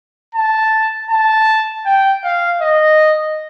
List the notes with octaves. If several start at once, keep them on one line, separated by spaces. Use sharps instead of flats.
A5
A5
G5
F5
D#5